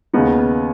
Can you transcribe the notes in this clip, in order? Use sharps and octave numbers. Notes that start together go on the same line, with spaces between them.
D#2 C#3 B3 D#4